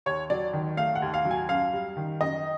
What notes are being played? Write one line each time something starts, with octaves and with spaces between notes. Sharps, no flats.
D#2 C#5
F#3 D5
D#3
A3 F5
F#5
D#2
F5
F#3
G#5
F#2 F5
G3
D#3
F#2 D#5